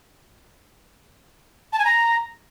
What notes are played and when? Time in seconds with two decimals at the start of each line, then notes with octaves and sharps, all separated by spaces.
1.73 A5
1.79 G#5
1.85 A#5